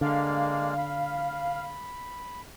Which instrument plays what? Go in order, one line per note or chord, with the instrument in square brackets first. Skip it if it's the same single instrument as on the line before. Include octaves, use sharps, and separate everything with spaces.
[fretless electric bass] D3 [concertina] G#3 A#3 D5 [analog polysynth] F5
[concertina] B5